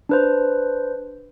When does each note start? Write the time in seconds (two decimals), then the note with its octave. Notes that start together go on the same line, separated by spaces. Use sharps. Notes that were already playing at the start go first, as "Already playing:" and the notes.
0.09 D4 B4 C5